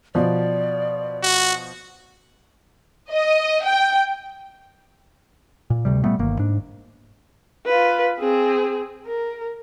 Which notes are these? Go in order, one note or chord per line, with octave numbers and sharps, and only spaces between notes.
B2 F3 D5
F#4
D#5
G5
A#2
D2 C3 G3
A#2 G3 A3 B3
G1 D#3 A#3
G#2 D4
F4 B4
C4 G#4
A#4